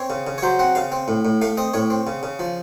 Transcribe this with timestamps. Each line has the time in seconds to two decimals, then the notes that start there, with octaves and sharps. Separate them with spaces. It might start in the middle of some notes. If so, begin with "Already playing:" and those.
Already playing: C4 C#5
0.10 C#3
0.27 C#3
0.38 C#5
0.43 F#3 C5
0.59 C4 F#5
0.75 C#3 F5
0.92 C4
1.08 A2
1.25 A2
1.41 A3 F5
1.58 C4 D#5
1.74 A2 C#5
1.90 C4
2.07 C#3
2.23 C#3
2.39 F3